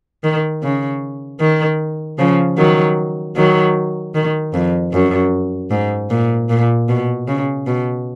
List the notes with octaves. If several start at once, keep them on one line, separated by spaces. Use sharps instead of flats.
D#3
C#3
D#3
C#3 F3
D#3 F#3
D#3 F#3
D#3
F2
F#2
G#2
A#2
A#2
B2
C#3
B2